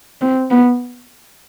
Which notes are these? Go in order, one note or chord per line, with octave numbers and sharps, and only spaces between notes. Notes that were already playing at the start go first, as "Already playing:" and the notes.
C4
B3